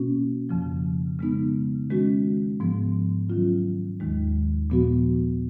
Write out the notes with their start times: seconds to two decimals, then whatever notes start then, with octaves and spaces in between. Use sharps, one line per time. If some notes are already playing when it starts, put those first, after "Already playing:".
Already playing: B2 A#3 C#4 F#4
0.49 F2 C#3 F3
1.19 C#3 G#3 B3 D#4
1.90 D#3 G#3 C#4 F#4
2.60 G#2 F3 B3
3.30 D#3 F#3 C#4 F4
4.00 D#2 D#3 G#3 D#4
4.70 A#2 F3 B3 F#4